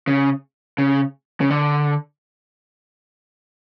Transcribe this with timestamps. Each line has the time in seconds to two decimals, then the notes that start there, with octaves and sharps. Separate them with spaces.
0.07 C#3
0.78 C#3
1.41 C#3
1.50 D3